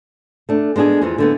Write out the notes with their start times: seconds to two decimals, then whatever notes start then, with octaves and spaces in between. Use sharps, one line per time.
0.49 A3 D4
0.76 G#3 B3 D4 G4 G#4
1.02 F2 E3 G#3
1.18 D3 A3 B3